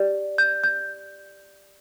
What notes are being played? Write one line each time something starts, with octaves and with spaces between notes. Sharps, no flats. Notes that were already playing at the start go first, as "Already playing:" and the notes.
Already playing: G4 D5
G6
G6